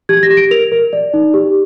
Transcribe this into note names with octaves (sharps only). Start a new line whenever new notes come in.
G4 G#6
A#6
G4
D7
A#4 F7
A#4
D5
D#4
G4